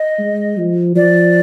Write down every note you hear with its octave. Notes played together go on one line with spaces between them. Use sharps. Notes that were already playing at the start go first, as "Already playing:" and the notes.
Already playing: D#5
G#3
F3
F3 D5